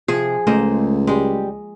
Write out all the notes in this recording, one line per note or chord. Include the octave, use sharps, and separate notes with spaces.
C3 F3 G#4
C#2 A3 A#3 C5 D#5
G3 G#3 G4